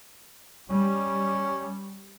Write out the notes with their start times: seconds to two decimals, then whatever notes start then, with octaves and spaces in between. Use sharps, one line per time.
0.70 G3 C#4